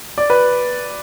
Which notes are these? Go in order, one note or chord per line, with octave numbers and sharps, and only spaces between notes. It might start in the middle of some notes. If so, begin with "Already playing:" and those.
D5
B4